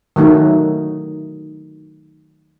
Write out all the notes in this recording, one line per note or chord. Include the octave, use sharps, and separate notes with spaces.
D#3 F#3 A3 D#4